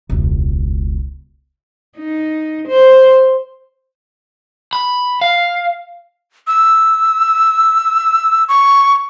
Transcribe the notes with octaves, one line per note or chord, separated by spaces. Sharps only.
E1 C#2
D#4
C5
B5
F5
E6
C#6